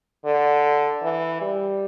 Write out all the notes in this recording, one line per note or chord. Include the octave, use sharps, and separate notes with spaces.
D3
E3
G3